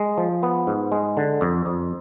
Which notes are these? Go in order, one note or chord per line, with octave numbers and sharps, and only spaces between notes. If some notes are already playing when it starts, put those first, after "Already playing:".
Already playing: G#3
F3
B3
G#2
G#3
D3
F2
F2